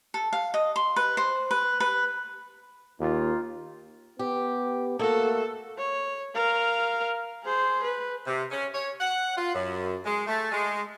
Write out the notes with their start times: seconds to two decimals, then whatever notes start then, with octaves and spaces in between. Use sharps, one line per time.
0.14 A4
0.33 F5
0.54 D#5
0.76 C6
0.96 B4
1.17 C5
1.51 B4
1.80 B4
3.00 D#2 A#3 D#4 F4
4.19 B3 G4
4.99 A3 A#3 F#4 A4
5.78 C#5
6.34 A#4 F5
7.44 G#4 C5
7.84 B4
8.27 C3
8.52 C#4
8.75 C#5
9.00 F#5
9.36 F4
9.54 F#2
10.06 G#3
10.27 A3
10.52 G#3